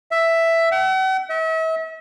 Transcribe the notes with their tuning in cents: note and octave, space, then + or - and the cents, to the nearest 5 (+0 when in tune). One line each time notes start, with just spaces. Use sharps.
E5 +5
F#5 +45
E5 -40